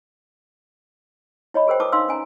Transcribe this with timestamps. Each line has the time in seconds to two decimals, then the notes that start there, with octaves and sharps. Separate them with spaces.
1.54 E4 C#5 D#5 B5
1.66 F#4 G#4 A#4 C5 G5
1.80 E4 A#4 B4 A5 D6 D#6
1.92 D4 D#4 F5 C6 E6
2.09 C#4 G#5 A#5